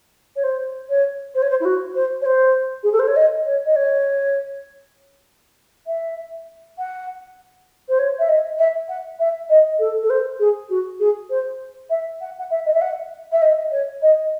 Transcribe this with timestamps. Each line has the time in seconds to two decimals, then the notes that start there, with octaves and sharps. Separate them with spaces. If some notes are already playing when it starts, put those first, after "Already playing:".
0.36 C#5
0.43 C5
0.89 C#5
1.35 C5
1.42 C#5
1.50 C5
1.60 E4
1.65 F#4
1.95 C5
2.21 C#5
2.25 C5
2.83 G#4
2.92 A4
2.99 C5
3.07 C#5
3.16 D#5
3.46 C#5
3.66 D#5
3.76 C#5
5.87 E5
6.78 F#5
7.89 C5
7.99 C#5
8.19 E5
8.28 D#5
8.58 E5
8.88 F#5
9.19 E5
9.49 D#5
9.79 A4
10.03 A4
10.10 C5
10.39 G#4
10.69 F#4
10.99 G#4
11.30 C5
11.90 E5
12.20 F#5
12.38 F#5
12.50 E5
12.66 D#5
12.74 E5
12.81 F#5
13.32 E5
13.42 D#5
13.71 C#5
14.02 D#5